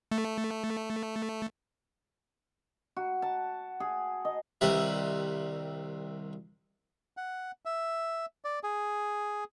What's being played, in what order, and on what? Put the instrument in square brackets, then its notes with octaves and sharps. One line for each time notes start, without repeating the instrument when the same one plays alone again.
[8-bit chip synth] A3
[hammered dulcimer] F#4
A5
G#4
D#5
[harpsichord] C2 D#3 G3 C4 B4 E5
[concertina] F#5
E5
D5
G#4